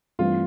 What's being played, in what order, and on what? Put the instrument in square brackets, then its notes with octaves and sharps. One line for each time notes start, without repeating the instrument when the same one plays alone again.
[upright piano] G2 E3 A3 C4 [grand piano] F4